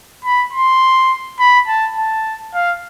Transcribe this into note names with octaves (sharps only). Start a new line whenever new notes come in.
B5
C6
B5
A5
A5
F5